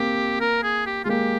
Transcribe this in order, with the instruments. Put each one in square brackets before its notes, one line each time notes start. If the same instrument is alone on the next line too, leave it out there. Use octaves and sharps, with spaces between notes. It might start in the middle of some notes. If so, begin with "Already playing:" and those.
Already playing: [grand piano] A#3 C4 [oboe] G4
[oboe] A#4
G#4
G4
[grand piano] G#3 [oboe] F4
[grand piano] A#3 [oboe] G4